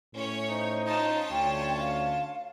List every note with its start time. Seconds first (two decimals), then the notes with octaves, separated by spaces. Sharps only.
0.14 A2 C#4 C#5
0.49 D#4 C5
0.86 C#4 D#4 F4 A5
1.31 D2 C#5 G5
1.79 F5